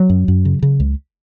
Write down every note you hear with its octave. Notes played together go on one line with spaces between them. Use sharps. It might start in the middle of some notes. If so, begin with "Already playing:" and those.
Already playing: F#3
F#2
F#2
C#3
C#3
C#2